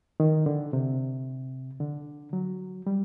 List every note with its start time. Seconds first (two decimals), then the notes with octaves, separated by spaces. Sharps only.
0.20 D#3
0.46 D3
0.73 C3
1.80 D3
2.33 F#3
2.87 G3